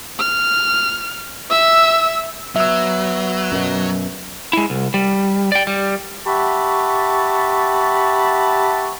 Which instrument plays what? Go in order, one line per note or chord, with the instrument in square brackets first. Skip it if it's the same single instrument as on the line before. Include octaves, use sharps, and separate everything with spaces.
[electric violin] F6
E5 E6
[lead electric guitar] F#3 [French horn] B3 [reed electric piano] E5 E6
[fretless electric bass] F#2 B2
[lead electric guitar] G#3 E4
C2
G3
D5 G5
G3
[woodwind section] G4 E5 F#5 A5 B5 C#6